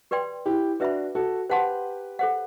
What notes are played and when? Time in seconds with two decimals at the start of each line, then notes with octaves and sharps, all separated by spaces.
0.11 G4 B4 D5 G5 C6
0.46 E4 G4
0.80 D4 F#4 B4 E5 B5
1.15 F#4 A4
1.50 G4 B4 C5 F#5 A5 C6
2.19 A4 C5 F#5